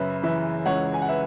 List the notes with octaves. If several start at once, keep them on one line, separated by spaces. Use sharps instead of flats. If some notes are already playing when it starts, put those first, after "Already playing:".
Already playing: F#2 C#3 B4 E5
E3 B4 E5
C#2 C#5 F#5
G#5
F#5
B4 E5